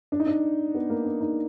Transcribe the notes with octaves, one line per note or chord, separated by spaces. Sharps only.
D4
D#4
D4
B3
A#3
D4
D#4